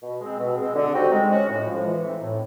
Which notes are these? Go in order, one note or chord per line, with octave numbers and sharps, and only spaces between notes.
B2
G#3 C4
B2
G#3 C4
D3
G3 C4 D#4 F#4
G#3
C#4 F#4
A2
F3 G#3
E3
A3 C4 D#4
A2